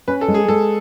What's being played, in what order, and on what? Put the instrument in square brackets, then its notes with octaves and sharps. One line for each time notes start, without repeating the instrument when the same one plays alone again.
[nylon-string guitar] C#4 [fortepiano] B4
[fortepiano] A4
[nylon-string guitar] G#3
[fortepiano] G#4
[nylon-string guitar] G#3 [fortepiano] A4